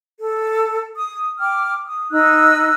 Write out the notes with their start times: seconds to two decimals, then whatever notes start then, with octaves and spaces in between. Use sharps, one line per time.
0.19 A4
0.96 D#6
1.39 G5 D6 F6
1.86 D#6
2.11 D#4 E6 F#6